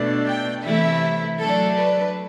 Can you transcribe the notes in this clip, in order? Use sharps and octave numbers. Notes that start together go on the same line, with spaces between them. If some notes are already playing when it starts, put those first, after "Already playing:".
Already playing: B2 A3 D4
G5
C3 E3 A3 E4 E5
F#3 A3 D4 A4
B4